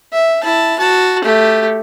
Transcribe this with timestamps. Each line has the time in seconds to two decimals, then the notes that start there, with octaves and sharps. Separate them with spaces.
0.13 E5
0.44 E4 A5
0.79 F#4 A5
1.24 A3 G4